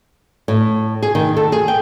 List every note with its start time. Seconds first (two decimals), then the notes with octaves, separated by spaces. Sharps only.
0.48 A2
1.02 G#4
1.15 D#3
1.37 A4
1.52 G#4
1.68 G5